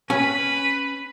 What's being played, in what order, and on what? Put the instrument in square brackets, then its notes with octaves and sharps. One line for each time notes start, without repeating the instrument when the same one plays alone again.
[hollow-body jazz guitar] C#4 G#5 [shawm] B4